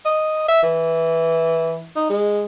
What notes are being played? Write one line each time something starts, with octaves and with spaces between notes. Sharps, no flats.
D#5
E5
E3
D#4
G#3